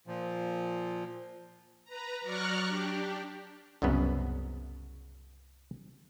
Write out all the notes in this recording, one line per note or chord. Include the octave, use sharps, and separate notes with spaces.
A#2 F3
B4 A#5
F#3 D5 A#5 C#6 F6 F#6
D4 G4
C2 F#2 C#3 B3